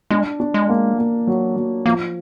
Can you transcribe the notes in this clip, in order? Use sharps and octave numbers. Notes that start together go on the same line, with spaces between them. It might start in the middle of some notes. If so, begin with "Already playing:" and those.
G#3 D4
D4
G#3
A#3
A#3
F#3
F#3
F3 A#3